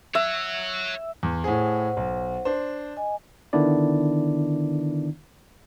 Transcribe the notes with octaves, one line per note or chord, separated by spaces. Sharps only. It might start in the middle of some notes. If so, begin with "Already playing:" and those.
C#5 E5 F#5
E2
A2 G#4 C5 F#5
B1
D4 C5
D#5 G#5
D3 D#3 B3 D4 E4 D5